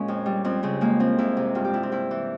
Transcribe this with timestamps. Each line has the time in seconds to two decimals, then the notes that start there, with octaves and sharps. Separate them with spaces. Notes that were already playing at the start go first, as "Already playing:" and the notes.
Already playing: A#2 G#3 C#4
0.08 F2
0.26 G3
0.44 F2 C4
0.63 C#3 C4
0.81 G#3 A#3
1.00 F3 C4
1.18 F2 E4
1.37 C3
1.55 G2 F4
1.65 G4
1.74 G3 E4
1.83 C4
1.92 G2 E4
2.11 E3